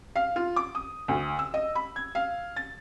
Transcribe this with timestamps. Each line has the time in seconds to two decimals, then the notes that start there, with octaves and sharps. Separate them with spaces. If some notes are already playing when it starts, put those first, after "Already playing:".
0.16 F5
0.36 F4
0.56 D6
0.75 D#6
1.08 D2
1.39 E6
1.54 D#5
1.75 B5
1.96 G#6
2.15 F5
2.56 A6